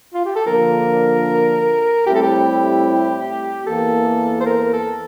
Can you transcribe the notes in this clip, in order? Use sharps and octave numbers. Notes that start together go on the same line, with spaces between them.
F4
G4
A4
D3 F3 A#3 D4 F4 A#4
A2 G3 C4 E4 G4
A4
G4
E2 E3 A#3 A4
C5
A#4
A4